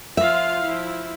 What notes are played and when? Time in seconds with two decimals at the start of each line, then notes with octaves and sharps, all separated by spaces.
0.17 F3 F4 E5 F5
0.64 F3 E4